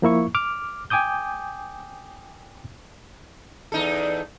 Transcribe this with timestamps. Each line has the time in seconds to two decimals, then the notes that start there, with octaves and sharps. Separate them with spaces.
0.02 F3 A#3 E4 C#6
0.35 D6 F6
0.90 G5 G#5 D6 D#6 G6
3.72 E2 D#4 A4